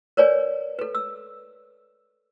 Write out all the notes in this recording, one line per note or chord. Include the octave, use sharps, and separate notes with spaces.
A#4 B4 C#5 D5 G#5
A4 B4
E6